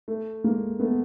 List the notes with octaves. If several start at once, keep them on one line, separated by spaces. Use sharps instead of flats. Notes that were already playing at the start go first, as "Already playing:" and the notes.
A3
G#3 A#3
A3 B3